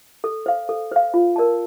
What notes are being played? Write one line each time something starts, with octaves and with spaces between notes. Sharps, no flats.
A4
C5 F5
A4
C5 F5
F4
A#4 D5 A5